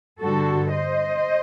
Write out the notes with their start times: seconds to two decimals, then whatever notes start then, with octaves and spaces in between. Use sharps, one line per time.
0.19 G2 D3 G3 F#4 A4
0.72 C5 D#5